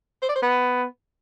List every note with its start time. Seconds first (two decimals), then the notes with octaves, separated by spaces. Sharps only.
0.22 C5
0.29 D5
0.36 C5
0.42 B3